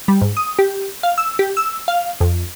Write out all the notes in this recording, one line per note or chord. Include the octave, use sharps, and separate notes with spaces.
G3
G#2
D#6
G4
F5
E6
G4
E6
F5
F2